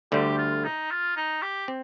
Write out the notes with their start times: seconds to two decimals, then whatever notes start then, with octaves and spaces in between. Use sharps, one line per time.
0.12 D2 D3 G3 G4
0.38 F4
0.65 D#4
0.91 F4
1.16 D#4
1.42 G4
1.68 C4